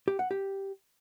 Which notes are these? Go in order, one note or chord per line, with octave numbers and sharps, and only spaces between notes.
G4
F#5
G4